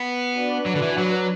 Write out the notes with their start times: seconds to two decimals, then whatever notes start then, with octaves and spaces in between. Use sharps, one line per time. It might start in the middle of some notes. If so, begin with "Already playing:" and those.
Already playing: B3
0.35 D4 F#4 B4 D5
0.66 F#3
0.76 D3
0.82 E3
0.98 F#3